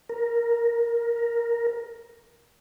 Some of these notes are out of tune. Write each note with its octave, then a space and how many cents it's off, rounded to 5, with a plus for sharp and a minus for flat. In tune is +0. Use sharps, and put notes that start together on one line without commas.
A#4 +5